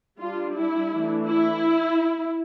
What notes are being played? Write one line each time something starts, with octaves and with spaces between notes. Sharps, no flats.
G3 D4 F4
E4
E3 A3 D4
E4